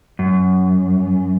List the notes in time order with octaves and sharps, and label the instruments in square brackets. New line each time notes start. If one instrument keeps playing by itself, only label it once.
[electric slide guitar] F#2